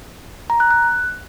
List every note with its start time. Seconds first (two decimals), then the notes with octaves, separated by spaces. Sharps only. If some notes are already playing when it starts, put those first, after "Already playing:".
0.50 A#5
0.60 F#6
0.71 F#6